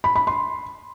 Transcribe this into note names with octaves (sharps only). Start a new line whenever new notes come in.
B5
B5
C6